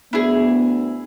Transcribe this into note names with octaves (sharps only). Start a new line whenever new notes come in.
D2 B3 E4 G#4